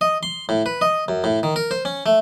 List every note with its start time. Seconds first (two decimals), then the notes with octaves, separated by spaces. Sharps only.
0.01 D#5
0.23 C6
0.49 A2
0.66 B4
0.81 D#5
1.08 F#2
1.24 A2
1.43 D#3
1.56 A#4
1.71 C5
1.85 C#4
2.06 A3